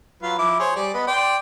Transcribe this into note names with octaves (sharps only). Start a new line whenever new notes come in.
F#3 F4 B4
F3 E4 D6
G#4 C5 C#5
G3 G#4 D5
B3 B4 D#5
D5 G5 C6